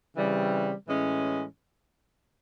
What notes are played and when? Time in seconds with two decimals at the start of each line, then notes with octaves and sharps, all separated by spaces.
0.15 C#3 E3 G3 C4
0.87 A2 E3 G#3 C#4